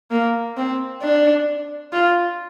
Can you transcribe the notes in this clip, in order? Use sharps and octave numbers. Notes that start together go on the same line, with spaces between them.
A#3
C4
D4
F4